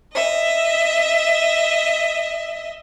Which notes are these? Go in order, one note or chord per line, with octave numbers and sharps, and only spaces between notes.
D#5 E5